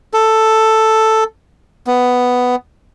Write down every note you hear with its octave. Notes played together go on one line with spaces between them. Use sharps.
A4
B3